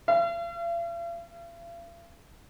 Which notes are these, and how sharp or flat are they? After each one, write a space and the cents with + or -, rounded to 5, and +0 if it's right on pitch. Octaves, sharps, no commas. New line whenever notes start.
F5 -45